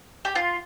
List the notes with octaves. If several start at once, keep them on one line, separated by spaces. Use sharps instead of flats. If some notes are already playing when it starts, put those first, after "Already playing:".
G4
F4